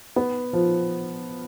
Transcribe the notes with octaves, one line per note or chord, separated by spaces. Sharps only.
B3
F3